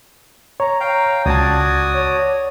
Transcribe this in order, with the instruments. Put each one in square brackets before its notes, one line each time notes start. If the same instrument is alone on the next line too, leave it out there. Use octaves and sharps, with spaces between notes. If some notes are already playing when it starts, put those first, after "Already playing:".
[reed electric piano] C#5 [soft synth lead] A#5
[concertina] F5 G5
[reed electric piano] C#2 A5 [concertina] F#4 D5 D#6 [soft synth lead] G#6
[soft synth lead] C#5